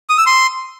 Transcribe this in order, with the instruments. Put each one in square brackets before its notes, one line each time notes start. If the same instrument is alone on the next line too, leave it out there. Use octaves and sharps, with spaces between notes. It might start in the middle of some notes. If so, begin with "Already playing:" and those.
[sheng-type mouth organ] D#6
E6
C6